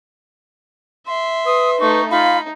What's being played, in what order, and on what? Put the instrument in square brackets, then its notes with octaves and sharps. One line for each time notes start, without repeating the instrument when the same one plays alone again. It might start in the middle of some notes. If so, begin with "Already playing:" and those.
[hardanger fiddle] E5 [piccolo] C6
[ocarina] B4 [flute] D#6
[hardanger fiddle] A3 D#4 [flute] C#6
[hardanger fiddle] D#4 [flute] F4 [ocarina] F5 [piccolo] B5